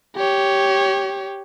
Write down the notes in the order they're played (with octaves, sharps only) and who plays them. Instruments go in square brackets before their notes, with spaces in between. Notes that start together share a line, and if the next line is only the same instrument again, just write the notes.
[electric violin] G4 C#5